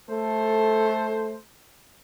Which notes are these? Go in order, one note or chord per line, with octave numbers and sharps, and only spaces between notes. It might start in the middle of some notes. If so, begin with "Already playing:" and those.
A3 A4 C5